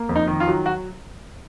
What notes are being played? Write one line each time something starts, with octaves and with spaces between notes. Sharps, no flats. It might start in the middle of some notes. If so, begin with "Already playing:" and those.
Already playing: A#3
F2
D#4
D#3
F4
F#3
F#4